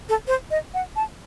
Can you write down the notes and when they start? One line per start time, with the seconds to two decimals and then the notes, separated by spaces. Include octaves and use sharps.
0.09 A4
0.27 C5
0.51 D#5
0.74 F#5
0.96 A5